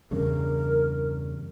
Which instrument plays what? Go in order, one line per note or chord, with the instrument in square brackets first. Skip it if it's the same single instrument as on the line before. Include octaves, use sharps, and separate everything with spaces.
[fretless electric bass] E2 G2 C#3 [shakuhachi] A#4